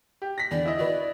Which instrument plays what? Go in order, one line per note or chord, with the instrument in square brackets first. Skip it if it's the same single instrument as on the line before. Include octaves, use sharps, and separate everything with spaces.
[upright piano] G4
A#6 B6
[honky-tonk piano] E2 D3 [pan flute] D5
[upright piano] E4 D#5
[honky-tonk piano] F#4 B4 [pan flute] D5